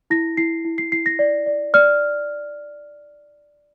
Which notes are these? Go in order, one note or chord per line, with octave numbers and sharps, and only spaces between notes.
E4 A#6
E4 C7
E4
C7
E4 C7
A#6
D5
D5
D5 F6